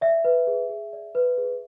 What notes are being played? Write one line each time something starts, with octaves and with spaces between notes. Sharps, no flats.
D5 E5
B4
G#4
G#4
D5
B4
G#4